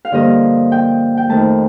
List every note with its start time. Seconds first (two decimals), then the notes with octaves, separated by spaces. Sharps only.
0.05 F5
0.12 G2 D3 F3 A#3 D#5
0.72 G5
1.17 G5
1.29 F2 D#3 A3 A5